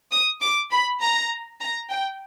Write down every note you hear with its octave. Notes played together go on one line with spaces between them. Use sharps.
D#6
D6
B5
A#5
A#5
G5